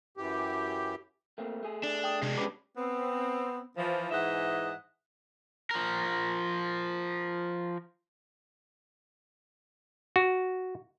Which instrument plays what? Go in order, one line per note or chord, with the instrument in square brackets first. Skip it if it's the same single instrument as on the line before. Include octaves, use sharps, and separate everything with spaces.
[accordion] F#2 E3 G4
[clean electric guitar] A3 A#3 C4
A3 G#4
[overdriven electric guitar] D4
[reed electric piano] G5 D#6
[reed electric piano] C3 [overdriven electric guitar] G#3 D4
[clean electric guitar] G3 C#4 B4 [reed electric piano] D6
[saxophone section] B3 C4
E3 F3
G#2 E3 D#5 E5 F#5
[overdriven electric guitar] F3 A#4
[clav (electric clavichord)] F#4